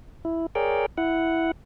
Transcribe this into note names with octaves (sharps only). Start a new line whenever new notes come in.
E4
G#4 A#4 C#5 D5 G5
E4 F#5